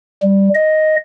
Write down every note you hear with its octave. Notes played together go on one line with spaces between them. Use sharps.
G3
D#5